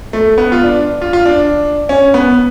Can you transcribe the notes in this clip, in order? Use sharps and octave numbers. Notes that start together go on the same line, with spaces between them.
A3
B3
F4
D4
F4
F4
D4
C#4
B3